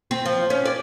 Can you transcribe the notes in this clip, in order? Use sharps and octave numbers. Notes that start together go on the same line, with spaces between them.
C4
F3
C#4
D5